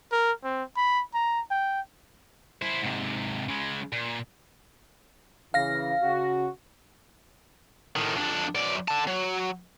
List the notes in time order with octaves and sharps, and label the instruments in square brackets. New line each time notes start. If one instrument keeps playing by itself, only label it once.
[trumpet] A#4
C4
B5
A#5
G5
[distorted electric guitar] E4 C5
G#2 C3
C#3 G#3
A#2
[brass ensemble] C#3 E3 [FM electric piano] F5 A#6
[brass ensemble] C#3 F#4
[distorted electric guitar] A2 D#3
F2 D4
F#2 D5
D3 A5
F#3